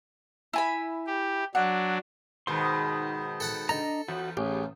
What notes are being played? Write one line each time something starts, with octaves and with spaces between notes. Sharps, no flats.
E4 G#5 B5
G4
F#3 D4 F#5
G#2 B2 D#3 C6
A4 F#5 A5
D4 A4 D#5 A#5
E2 F#4
A1 G4 G#4